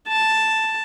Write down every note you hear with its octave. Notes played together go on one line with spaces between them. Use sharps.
A5